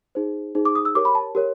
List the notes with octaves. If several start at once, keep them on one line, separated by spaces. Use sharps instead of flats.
D#4 G#4 C5
D#4 G#4 C5
D6
D#6
E6
G4 A#4 C#5 D6
B5
A5
G4 A#4 C#5